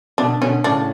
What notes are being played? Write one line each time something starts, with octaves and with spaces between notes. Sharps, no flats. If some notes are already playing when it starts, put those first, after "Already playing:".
B2 D3 D4
B2 D3 C#4
A2 C#3 D4